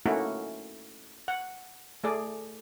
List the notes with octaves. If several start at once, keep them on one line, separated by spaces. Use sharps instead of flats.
A3 A#3 C#4 D#4 E4 F#4
F#5
A3 G#4 D5